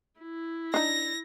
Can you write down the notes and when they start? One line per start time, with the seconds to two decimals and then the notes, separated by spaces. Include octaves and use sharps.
0.21 E4
0.74 D4 D#4 A#6